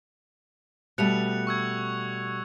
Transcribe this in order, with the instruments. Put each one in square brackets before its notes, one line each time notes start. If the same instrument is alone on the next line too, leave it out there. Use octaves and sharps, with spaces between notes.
[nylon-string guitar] B2 G3 A3 [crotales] F#6 C#7 F7
[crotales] C#6 E6 G#6